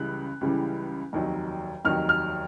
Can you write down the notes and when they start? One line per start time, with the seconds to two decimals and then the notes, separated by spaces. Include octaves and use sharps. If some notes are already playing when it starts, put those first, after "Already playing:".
Already playing: C#2 C#3 E3 G3 F#6
0.41 C#2 C#3 E3 G3
1.13 F1 D#2 D#3 F#3
1.85 F1 D#2 D#3 F#3 F6
2.09 F6